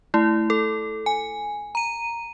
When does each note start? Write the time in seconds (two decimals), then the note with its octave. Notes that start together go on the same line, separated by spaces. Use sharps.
0.14 A3 E4
0.50 A4
1.06 G#5
1.75 A#5 D#7